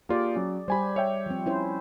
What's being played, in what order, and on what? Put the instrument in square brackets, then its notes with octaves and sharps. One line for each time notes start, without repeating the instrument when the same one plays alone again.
[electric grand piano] A#3 F4 G4 [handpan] G#4 D5
[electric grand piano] F#3 C#4
[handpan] G3 G4 [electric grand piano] C5 G#5 B5
[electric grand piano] C#5 E5 G5
[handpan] F3 C4
C#4 E4 C5